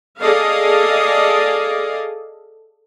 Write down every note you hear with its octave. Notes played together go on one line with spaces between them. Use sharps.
G#4 A4 D5 D#5 F5